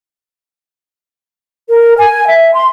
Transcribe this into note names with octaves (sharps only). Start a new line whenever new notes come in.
A#4
G#5
E5
C6